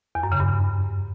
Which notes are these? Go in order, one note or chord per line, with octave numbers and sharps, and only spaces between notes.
E2
F#2
C#3
G2